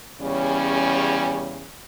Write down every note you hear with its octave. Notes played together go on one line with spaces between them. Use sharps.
E2 C#3 G3 C#4